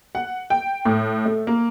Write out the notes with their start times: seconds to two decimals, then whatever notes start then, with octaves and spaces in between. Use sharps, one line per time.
0.15 F#5
0.50 G5
0.85 A2
1.25 A3
1.47 A#3